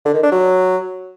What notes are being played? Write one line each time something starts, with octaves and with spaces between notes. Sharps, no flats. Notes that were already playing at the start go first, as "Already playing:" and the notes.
D3
D#3
D4
F#3